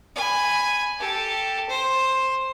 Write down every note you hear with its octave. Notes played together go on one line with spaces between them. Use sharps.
G#5 B5
G4 A4
C5